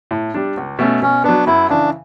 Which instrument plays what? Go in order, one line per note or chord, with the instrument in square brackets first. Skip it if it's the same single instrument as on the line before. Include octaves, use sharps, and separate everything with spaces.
[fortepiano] A2
G3 D4
C#2
B2 A3 C#4
[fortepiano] B2 [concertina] C#4
[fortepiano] F#3 B3 [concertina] D4
[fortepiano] F#2 [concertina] E4
[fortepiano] C#3 E3 [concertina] D4